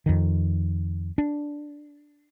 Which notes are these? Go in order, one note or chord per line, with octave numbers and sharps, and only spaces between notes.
F2 D#3
D4